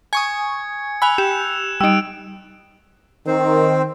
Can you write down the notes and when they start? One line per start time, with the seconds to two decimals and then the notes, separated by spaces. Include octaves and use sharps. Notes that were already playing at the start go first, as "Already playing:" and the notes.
0.13 G#5 C#6 D#6 G#6 C#7
1.02 G#5 B5 E6 F#6 F7
1.18 G4 E7
1.81 G3 D#4 E6 D7
3.27 D#3 C4 C5